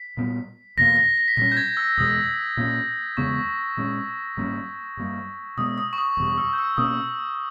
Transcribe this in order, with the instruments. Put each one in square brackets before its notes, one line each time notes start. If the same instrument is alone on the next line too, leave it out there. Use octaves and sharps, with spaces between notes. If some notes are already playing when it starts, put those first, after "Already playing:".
Already playing: [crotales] B6
[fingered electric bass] A#2 G3 B3
[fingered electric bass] E2 B2 A#3 [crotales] A#6
[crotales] A#6
A#6
B6
[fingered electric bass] A#2 G3 C#4 [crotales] A#6
[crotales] G6
G#6
E6
[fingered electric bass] E2 B2 G#3 [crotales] D#6
[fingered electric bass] A#2 A#3 C#4
[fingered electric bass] E2 C#3 G#3 B3 [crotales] C#6
[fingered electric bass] A#2 G#3 C#4
G#2 G3 A#3 C#4
G2 G3 A#3
[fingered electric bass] B2 G#3 B3 [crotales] D#6
[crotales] D#6
C#6
D#6
[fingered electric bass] E2 B2 G3
[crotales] E6
G6
E6
[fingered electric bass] B2 A#3 C#4 [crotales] D#6